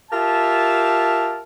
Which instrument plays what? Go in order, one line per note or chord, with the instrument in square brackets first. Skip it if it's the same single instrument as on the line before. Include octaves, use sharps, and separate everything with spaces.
[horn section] F4 G4 A#4 E5 A5